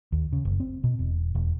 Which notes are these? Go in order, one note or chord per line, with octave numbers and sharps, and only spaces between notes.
D#2
C#3
F#1
C4
B2
E1
E1